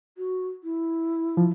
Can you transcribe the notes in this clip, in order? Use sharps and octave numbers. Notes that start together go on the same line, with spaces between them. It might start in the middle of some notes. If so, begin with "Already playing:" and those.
F#4
E4
F3